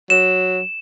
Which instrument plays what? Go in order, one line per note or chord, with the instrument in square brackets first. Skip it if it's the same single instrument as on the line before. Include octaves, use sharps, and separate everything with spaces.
[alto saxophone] F#3 [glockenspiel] E7